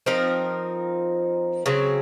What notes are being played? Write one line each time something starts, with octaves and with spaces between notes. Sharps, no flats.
F3 C4 D#4 A#4
C#3 F#3 C4